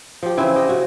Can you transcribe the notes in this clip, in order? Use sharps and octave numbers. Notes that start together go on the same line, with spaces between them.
F3 G4
C#3 E3 C4 E4
G4 D#5
C#3 F#4